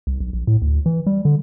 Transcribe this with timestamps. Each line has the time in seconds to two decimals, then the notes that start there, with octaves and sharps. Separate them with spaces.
0.07 C2
0.20 B1
0.33 A#1
0.47 A2
0.62 D2
0.86 E3
1.07 G3
1.25 D3